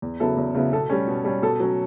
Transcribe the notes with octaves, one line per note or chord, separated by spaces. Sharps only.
E2
C#3 F#3 B3 E4 A4
E2
C#3 F#3 B3 E4
B2 A4
G3 C#4
B2
G3 C#4
B2 A4
F#3 C#4